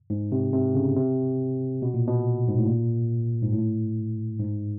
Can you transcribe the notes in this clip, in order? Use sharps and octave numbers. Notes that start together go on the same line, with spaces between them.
G#2
C3
C3
C#3
C3
B2
A#2
B2
G#2
A2
A#2
G#2
A2
G#2